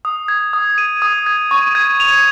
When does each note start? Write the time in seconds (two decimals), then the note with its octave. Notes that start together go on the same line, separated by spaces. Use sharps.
0.05 D#6
0.28 G#6
0.53 D#6
0.78 D#7
1.02 D#6
1.26 G#6
1.51 C#6
1.75 G#6
2.00 F7